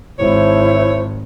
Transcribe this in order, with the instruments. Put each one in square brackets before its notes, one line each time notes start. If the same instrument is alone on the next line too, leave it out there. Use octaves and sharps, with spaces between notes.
[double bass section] G#1 [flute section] E4 C5 [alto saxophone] C#5